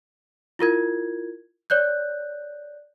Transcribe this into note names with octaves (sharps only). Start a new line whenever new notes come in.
E4 F4 A#4 G#6
C#5 D5 F#6 G6